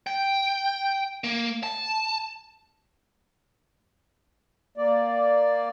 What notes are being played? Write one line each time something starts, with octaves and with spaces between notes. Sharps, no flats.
G5
A#3
A5
A#3 D5